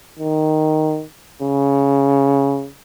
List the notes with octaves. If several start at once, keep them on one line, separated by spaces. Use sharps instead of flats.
D#3
C#3